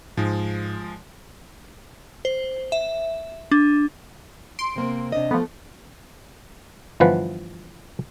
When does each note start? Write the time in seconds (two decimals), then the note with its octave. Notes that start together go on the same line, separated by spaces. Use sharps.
0.17 G#2 F3 G#3
2.25 C5
2.72 E5
3.51 D4
4.59 C6 D7
4.76 C3 A#3 C4
5.12 C3 D4 D#5
5.31 F3 A3 B3
7.00 G1 E3 F3 B4 F#5